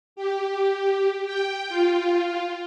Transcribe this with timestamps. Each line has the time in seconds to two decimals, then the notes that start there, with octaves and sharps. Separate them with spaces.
0.16 G4
1.25 G5
1.69 F4